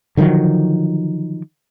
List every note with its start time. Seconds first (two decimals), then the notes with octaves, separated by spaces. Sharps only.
0.17 D3 D#3 F3 F#3